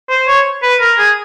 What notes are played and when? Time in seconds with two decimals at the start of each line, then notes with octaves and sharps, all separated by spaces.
0.09 C5
0.28 C#5
0.63 B4
0.80 A#4
0.98 G#4